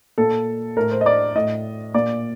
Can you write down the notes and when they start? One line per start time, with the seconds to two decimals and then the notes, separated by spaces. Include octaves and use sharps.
0.18 A#2 A4
0.77 A2 A#4
0.91 C5
1.01 D#5
1.06 D5
1.36 A2 D#5
1.94 A#2 D5